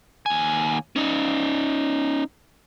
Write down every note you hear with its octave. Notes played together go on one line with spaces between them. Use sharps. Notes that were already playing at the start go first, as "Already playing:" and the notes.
D#2 G#5
C#4 D#4